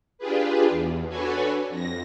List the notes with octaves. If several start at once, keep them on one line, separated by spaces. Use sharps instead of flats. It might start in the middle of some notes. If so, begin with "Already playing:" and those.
D4 F4 G4 G#4 B4
E2
D4 F#4 A4 B4 C#5 G#5
F2 A#6